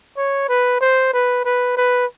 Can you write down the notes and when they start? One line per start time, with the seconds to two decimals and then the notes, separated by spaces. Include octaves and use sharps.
0.18 C#5
0.49 B4
0.81 C5
1.13 B4
1.45 B4
1.77 B4